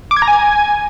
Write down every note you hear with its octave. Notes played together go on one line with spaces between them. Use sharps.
D6
G#6
A#5
G#5